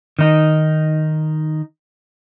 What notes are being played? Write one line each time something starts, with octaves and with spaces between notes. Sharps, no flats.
D#3 D#4